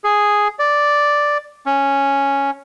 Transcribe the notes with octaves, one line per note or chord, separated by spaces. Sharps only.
G#4
D5
C#4